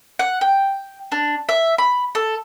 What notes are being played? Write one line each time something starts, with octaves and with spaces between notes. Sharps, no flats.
F#5
G5
D4
E5
B5
A4